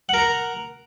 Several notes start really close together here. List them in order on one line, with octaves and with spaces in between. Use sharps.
F#5 A#4 A#5